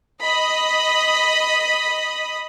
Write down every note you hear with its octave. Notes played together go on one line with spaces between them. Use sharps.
D#5 B5 D#6